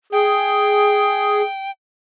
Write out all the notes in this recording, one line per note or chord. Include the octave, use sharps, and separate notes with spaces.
G#4 G5